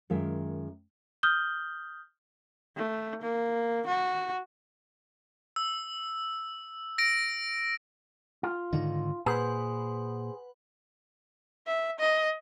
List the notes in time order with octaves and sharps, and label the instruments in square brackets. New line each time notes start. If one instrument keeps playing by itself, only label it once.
[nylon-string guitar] F#2 D#3 G#3 F4 A#4 E5
[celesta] D#6 F6 G6 G7
[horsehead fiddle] A3
A#3
F#4
[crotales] E6
A#6 D7
[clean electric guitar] F4
[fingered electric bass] G#2 D3 D#3 [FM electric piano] D#4
[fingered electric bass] A#2 [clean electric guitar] G#4 C5 [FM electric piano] B4 F#5 B5
[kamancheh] E5
D#5